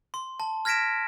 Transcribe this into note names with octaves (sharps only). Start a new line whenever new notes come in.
C6
A5
F6 G#6 A#6 B6 D7 E7